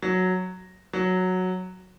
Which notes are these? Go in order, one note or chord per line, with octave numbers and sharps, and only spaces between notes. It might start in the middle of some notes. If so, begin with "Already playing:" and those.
F#3
F#3